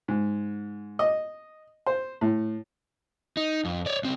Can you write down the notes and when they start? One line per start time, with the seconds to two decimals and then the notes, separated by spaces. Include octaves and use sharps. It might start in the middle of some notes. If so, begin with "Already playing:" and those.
0.08 G#2
0.99 D#5
1.86 C5
2.21 A2
3.37 D#4
3.65 F2
3.86 C#5 D5
4.03 C#2 C4